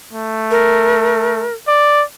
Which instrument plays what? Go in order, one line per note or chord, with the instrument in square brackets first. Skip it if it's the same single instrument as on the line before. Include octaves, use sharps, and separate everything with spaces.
[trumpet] A3
[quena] A#4
[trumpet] D5